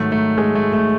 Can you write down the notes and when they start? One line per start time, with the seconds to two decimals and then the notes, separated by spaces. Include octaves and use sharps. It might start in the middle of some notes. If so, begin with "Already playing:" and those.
Already playing: G#2 D#3 F#3 A3
0.12 A3
0.38 G#3
0.55 A3
0.73 A3